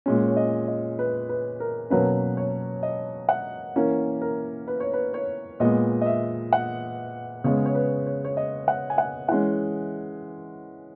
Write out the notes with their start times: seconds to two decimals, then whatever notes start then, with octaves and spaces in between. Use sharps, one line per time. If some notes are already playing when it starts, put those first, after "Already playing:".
0.06 A#2 G#3 C#4
0.27 C#5
0.37 D#5
0.68 D#5
0.99 B4
1.29 B4
1.60 A#4
1.90 B2 F#3 A#3 C#4 B4
2.37 C#5
2.83 D#5
3.29 F#5
3.76 E3 A#3 C#4
4.21 A#4
4.68 B4
4.80 C#5
4.94 B4
5.14 C#5
5.60 A#2 G#3 B3 D#5
6.02 D#5
6.06 E5
6.53 F#5
7.44 C#3 G#3 B3 C#5
7.66 C#5
7.75 B4
8.06 C#5
8.25 C#5
8.37 D#5
8.68 F#5
8.90 G#5
8.98 F#5
9.29 E3 G#3 C#4 F#5